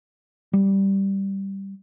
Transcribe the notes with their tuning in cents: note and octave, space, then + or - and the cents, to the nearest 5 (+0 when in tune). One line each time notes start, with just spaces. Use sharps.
G3 -5